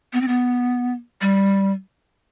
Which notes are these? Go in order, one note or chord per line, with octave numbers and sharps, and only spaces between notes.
B3
C4
B3
G3